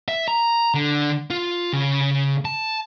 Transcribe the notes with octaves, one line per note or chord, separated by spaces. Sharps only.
E5
A#5
D3
F4
C#3
A5